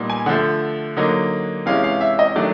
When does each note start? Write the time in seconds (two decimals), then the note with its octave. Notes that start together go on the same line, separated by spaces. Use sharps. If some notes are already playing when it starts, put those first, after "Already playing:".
Already playing: A#2 G3 B3 D#4
0.10 G#5
0.26 D3 F3 A3 F#5
0.97 D3 F#3 A#3 D#4
1.66 C3 E3 G#3 C#4 F5
1.84 F5
2.01 E5
2.19 D#5
2.36 D#3 F#3 A3 D4 D5